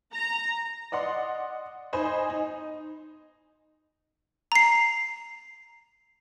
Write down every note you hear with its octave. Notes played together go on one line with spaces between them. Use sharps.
A#5
D5 D#5 F#5 C6
D#4 C5 D#5 G#5 B5
D#4
A#5 C7